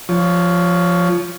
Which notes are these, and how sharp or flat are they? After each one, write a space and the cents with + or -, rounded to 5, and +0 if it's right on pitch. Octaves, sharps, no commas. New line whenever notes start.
F3 +0 C#5 +15